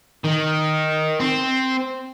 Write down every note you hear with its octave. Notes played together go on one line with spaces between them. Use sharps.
D#3
C4